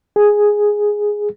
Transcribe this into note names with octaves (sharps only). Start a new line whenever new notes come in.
G#4